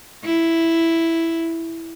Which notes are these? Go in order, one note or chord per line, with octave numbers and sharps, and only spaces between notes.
E4